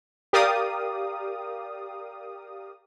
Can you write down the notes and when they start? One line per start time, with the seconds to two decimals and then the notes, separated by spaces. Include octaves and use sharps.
0.33 G4 A#4 D5 F5 D#6